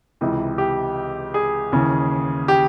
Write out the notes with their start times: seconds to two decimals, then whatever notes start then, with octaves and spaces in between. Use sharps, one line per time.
0.21 C#2 C3 E3
0.58 G4
1.34 G#4
1.72 D#2 C#3 E3
2.48 G4